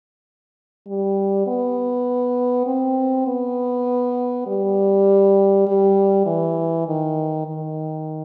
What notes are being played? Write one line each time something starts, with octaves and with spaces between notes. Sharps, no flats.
G3
B3
C4
B3
G3
G3
E3
D#3
D#3